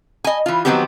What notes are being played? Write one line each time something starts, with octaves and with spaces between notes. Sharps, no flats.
D#5 G#5
E3 F4
D#3 F3 F#3 B3 C4 G4